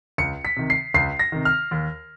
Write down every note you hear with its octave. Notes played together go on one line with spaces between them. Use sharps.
C#2 C#7
B6
C3 D#3
C7
C#2 C7
A#6
C3 D#3
F6
D#2